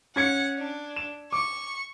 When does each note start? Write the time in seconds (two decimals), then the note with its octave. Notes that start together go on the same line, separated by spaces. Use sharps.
0.16 C#4 F#5 G#6 C#7
0.58 D4
0.96 E7
1.32 C#6 D6